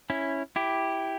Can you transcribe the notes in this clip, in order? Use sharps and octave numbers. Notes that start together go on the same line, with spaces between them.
C#4 E4
E4 G4